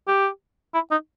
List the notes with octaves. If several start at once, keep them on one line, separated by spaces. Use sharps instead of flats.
G4
E4
D#4